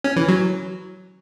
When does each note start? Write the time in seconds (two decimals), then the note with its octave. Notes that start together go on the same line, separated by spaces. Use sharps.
0.04 C#4
0.16 E3
0.28 F#3